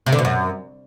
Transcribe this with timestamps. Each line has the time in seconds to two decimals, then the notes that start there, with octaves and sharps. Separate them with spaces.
0.06 C3
0.12 D3
0.19 B2
0.25 F#2